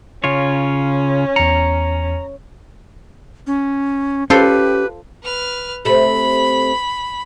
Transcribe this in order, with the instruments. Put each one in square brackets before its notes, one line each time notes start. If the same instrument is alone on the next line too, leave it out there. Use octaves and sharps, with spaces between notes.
[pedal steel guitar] C#3 F4 C#5 [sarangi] C#4
[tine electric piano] E2 C#7 [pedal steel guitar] A#5
[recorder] C#4
[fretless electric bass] C#4 [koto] F4 A4 C5 [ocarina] G4 [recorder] B4
[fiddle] B4 F6
[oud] C3 A3 [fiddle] B5